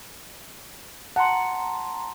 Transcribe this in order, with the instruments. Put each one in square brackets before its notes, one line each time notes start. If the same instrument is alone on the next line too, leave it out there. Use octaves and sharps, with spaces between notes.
[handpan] F#5 [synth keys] A5 A#5 C6